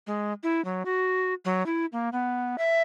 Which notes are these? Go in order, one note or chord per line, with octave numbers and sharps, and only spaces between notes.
G#3
E4
F#3
F#4
F#3
E4
A#3
B3
E5